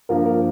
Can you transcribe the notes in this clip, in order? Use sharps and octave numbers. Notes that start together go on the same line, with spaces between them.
G2 F3 A#3 A#4
A#4